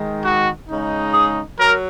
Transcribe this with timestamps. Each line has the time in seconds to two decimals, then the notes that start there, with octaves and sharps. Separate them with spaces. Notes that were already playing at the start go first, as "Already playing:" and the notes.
Already playing: D#3 G#3 D#4
0.23 F#4
0.68 C#3 G#3 D#4
1.14 G#4
1.58 F#3 A#4